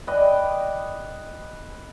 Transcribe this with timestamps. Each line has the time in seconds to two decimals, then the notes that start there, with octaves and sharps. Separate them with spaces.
0.07 B4 D5 D#5 G5